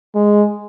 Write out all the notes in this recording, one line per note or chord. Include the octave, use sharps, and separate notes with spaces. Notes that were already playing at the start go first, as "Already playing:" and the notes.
G#3